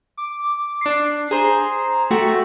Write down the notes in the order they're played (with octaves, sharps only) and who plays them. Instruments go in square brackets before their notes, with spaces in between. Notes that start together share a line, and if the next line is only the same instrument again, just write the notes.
[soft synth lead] D6
[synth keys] D4 C7
[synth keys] G#4 C5 [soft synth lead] A#5
[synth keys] A3 F#4 [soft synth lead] G5